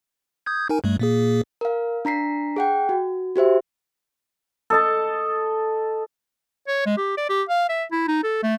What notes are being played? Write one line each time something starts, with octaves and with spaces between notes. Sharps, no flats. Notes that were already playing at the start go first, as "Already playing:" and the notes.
D#6 G6 G#6
D#4 A#4 G#5
G2 G3 A3
A#2 A#3 G#4
A#4 F5
D4 A#5 B6 C7
G#4 F#5 G5
F#4
F#4 G4 C5 E5
A4 D#5 A5
C#5
G#3
G4
D5
G4
F5
E5
E4
D#4
A4
A3